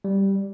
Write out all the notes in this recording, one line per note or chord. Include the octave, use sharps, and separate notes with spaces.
G3